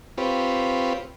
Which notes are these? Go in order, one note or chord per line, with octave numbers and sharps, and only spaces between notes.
C4 F4 G4 B4 C#5